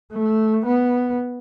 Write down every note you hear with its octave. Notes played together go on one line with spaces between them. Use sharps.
A3
B3